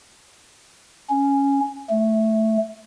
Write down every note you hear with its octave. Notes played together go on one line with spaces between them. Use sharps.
C#4
A3